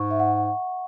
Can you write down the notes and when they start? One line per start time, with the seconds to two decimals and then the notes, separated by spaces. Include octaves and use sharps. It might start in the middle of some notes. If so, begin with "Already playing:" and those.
Already playing: G#2 C#6
0.11 E5
0.20 F#5